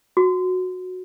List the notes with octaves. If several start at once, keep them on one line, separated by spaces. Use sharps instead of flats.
F#4